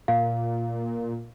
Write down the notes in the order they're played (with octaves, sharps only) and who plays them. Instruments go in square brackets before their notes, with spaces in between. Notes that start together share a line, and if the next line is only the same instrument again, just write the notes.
[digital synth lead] A#2 [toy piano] F5